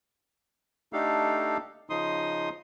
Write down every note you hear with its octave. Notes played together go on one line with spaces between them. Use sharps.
A3 D4 D#4 G4 A4 F5
C#3 F3 D#4 C6 D#6